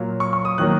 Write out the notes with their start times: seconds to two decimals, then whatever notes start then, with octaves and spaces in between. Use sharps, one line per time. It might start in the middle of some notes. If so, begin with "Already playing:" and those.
Already playing: A#2 F#3 A#3
0.20 C#6
0.33 C#6
0.45 D#6
0.58 D#3 F#3 A#3 F#6